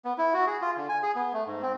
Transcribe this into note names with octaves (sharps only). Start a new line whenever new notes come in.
B3
E4
F#4
G#4
F4
D3
G#5
G#4
B3
A3
G#2
C4